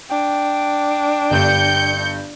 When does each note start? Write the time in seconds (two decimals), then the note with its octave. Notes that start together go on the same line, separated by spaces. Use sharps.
0.10 D4 G5
1.30 G1 G2 G6 C#7